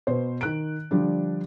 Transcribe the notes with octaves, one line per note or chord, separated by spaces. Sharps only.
B2 B4 C5
D#3 F#6 D7
D3 F3 G3 D4